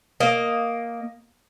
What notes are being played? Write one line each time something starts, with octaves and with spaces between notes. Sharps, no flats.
A#3 D#5